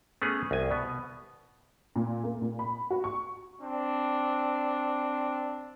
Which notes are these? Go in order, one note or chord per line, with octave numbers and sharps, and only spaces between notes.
A3 B3 C#4 G#4
C2 G#5
B2 B3
A#2
A#3
A#2
B5
F#4
C#6
C4 D4